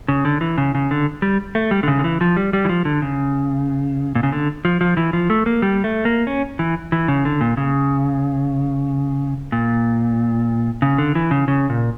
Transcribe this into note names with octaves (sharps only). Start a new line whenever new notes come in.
C#3
D3
E3
C#3
C#3
D3
G3
A3
G3
D3
C#3
D3
E3
F3
G3
G3
E3
F3
D3
C#3
A#2
C#3
D3
F3
F3
E3
F3
A3
A#3
G3
A3
A#3
C#4
E3
E3
C#3
D3
A#2
C#3
A#2
C#3
D3
E3
C#3
C#3
A#2